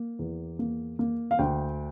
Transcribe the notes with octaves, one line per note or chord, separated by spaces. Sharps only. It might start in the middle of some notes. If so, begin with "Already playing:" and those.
Already playing: A#3
E2
A#3
A#3
F5
D2 G5